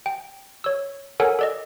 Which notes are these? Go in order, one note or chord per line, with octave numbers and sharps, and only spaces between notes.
G5
C#5 E6
A4 A#4 C#5 F#5 G#5
A4 D5 D#5